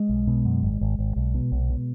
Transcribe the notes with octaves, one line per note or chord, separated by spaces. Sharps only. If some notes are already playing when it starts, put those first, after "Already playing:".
Already playing: G#3
B1
B2
F#2
G#1
G#1
G#1
B1
B2
B1
B2